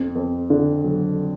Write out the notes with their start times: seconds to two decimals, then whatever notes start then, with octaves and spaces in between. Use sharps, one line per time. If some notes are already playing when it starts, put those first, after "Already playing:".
Already playing: F2
0.15 F2
0.50 D3
0.84 F#3